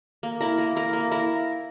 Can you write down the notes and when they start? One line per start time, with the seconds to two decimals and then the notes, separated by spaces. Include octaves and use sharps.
0.23 A#3
0.41 E4 A#4
0.58 A#3
0.76 E4 A#4
0.93 A#3
1.11 E4 A#4